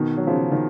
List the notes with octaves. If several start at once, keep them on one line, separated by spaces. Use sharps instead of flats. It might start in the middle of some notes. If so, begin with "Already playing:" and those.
Already playing: B2 D#3
F#3
C#3 F3
D#3